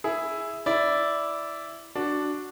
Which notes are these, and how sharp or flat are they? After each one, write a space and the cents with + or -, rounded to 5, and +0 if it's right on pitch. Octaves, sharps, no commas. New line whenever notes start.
E4 +0 G#4 +0
E4 +0 D5 -10
D4 +0 F#4 +0